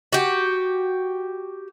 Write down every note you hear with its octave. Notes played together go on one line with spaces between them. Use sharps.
F#4 G4